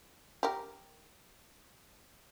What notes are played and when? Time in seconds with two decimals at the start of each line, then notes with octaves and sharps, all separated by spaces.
0.43 G4 A#4